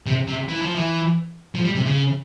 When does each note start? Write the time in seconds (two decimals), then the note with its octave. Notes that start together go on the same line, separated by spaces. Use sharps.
0.07 C3
0.27 C3
0.48 E3
0.62 F3
0.76 E3
1.55 F3
1.65 G3
1.75 C3
1.86 C#3